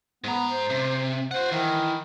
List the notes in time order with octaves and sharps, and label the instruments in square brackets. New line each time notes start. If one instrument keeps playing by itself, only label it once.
[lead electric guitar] G#2 A#5 [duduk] B3
[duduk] C5
[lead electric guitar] C3
[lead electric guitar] F4 F#5 [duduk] C5
[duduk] D#3 [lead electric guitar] E3